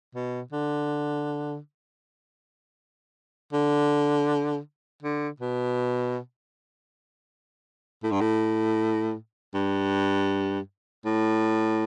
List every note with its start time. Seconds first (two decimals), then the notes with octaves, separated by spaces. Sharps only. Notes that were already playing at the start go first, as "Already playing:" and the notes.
0.15 B2
0.52 D3
3.53 D3
5.03 D3
5.40 B2
8.03 A2
8.11 G2
8.21 A2
9.54 G2
11.05 A2